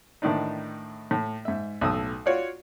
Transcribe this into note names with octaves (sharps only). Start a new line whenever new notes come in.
A2 D#3 E3 D4 D#4
A2
G#2 E5
B1 A2 D#6 E6
F4 F#4 C#5 D5 F5